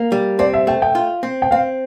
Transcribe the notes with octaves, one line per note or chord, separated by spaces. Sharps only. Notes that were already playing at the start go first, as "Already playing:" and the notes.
Already playing: A#3
G3
C4 D5
E5
A3 G5
G5
F4
C4
G5
C4 F5